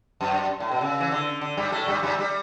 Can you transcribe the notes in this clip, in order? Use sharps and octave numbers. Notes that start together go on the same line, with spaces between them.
F#2
A2
B2
C#3
E3
D3
D3
G2 G3
A2 A3
G2 G3
G2 G3
G3